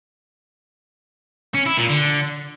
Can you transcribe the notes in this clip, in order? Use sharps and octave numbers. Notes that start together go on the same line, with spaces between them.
C#4
E4
A#2
D3